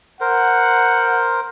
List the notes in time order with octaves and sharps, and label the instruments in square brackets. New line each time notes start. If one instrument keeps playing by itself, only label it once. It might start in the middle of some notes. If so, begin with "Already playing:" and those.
[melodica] A#4 C5 [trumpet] F#5